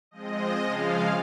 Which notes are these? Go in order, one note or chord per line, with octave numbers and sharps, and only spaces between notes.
F3 G#3 C4 D#5
C#3 F3 G#3 F5